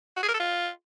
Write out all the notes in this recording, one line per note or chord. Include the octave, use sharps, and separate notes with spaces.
F#4
G#4
A#4
A4
F4